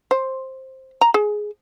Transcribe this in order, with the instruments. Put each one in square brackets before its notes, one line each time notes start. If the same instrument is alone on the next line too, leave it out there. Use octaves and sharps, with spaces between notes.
[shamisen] C5
A#5
G#4